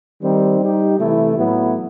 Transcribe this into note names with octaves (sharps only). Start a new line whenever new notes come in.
D#3 G3 C4 D#4
G3 D#4 G4
C3 E3 A3 E4
A2 F#3 B3 E4